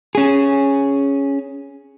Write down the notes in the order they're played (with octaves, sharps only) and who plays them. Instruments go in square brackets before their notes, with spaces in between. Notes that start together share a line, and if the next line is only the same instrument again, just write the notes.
[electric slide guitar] C#4 G#4